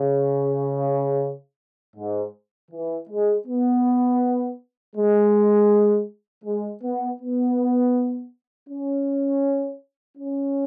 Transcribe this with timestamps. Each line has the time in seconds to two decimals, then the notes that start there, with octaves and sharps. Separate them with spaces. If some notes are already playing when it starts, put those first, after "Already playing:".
Already playing: C#3
1.97 G#2
2.71 E3
3.09 G#3
3.47 B3
4.96 G#3
6.45 G#3
6.83 B3
7.20 B3
8.70 C#4
10.18 C#4